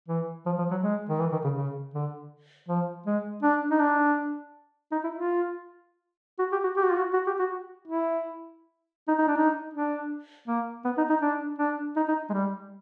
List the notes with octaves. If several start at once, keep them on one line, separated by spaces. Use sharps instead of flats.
E3
F3
F3
F#3
G#3
D#3
E3
D#3
C#3
C#3
D3
F3
G#3
D4
D#4
D4
D#4
E4
F4
F#4
G4
F#4
G4
F#4
F4
F#4
F#4
G4
F#4
E4
D#4
D#4
D4
D#4
D4
A#3
B3
D#4
D#4
D4
D4
D#4
D#4
G#3
G3